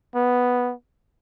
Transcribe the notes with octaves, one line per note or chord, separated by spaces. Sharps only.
B3